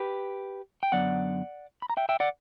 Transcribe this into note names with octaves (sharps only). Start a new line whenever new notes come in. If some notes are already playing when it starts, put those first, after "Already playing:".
Already playing: G4 B4
G5
F#2 D3 F#3 B3 D5 F#5
B5
A#5
E5 G5
E5 G5
D5 F#5